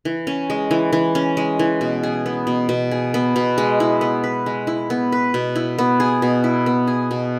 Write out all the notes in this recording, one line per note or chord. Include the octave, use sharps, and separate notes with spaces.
E3
C#4
G#3
E3
E3
C#4
G#3
E3
B2
G#4
B3
B2
B2
G#4
B3
B2
G#3
E4
B3
B4
G#3
E4
B3
B4
B2
E4
B3
G#4
B2
E4
B3
G#4
B2